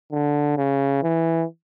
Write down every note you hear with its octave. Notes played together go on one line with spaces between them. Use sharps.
D3
C#3
E3